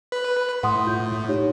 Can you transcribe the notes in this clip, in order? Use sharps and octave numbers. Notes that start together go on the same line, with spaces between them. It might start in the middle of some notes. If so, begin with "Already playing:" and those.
B4
A2 F#5 C6 D#6
F4 G6
D#4 G4 C#5